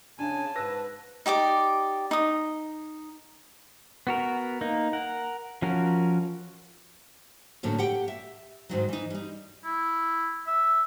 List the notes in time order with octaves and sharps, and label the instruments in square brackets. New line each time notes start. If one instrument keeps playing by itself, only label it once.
[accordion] C#3 G#5 [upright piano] D4 [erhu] A5
[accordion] G#2 B4 [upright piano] E6 A#6
[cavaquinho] D#4 G4 D5 D6
D#4 D#6
[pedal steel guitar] B3 F#4 A#4
A#3 D#4
A#4 F#5
F3 C#4 F#4 A#4
[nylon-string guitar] A2 D3 F#3 A#3 C#4
G4 F#5 G5
E5
G#2 D#3 F#3
E3 D#4
G3 D#4
[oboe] E4
E5